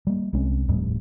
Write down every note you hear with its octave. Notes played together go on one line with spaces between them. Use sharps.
G3 A#3
C2 G#3 C4 C#4
D#1 F2 A2 G3